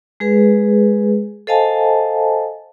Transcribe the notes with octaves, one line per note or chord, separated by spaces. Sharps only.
G#3 G#4 B4
A4 C5 D#5 F5 G#5 A5